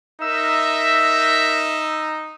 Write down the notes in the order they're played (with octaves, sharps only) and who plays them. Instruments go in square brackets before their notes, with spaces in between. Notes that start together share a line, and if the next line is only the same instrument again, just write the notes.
[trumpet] D#4 [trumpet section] A#4 E5 [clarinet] E6